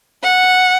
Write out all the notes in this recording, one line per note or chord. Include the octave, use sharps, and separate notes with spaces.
F#5